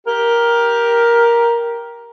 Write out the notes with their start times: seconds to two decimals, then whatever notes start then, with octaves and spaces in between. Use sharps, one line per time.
0.06 G4 A#4